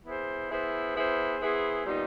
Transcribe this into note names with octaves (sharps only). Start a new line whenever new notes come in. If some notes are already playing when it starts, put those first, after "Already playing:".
B3 E4 G#4 C5
B3 E4 G#4 C5
B3 E4 G#4 C5
B3 E4 G#4 C5
A#2 G3 B3 D#4